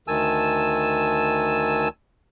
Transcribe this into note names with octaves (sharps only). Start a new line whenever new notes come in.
D2 D#3 G#5 A5 E6